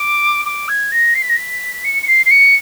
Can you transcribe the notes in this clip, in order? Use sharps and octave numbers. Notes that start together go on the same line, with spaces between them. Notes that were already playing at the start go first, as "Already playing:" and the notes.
Already playing: D6
D6
G#6
A#6
C7
B6
A#6
B6
C#7
C#7
C7
C7
C#7